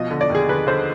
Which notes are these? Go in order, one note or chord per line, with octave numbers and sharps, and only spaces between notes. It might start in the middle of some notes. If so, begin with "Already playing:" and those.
Already playing: B2 F3 D#5
D3
D5
D#2
G#4
D3 B4
D3 C5